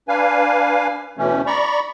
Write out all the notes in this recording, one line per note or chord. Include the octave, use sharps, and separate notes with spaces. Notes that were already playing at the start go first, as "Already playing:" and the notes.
D4 B4 F5 G#5
D2 B2 E3 A3 C#4
D5 A#5 B5 C#6